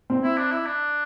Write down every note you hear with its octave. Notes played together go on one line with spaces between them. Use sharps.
C4
E4
D4
E4
D4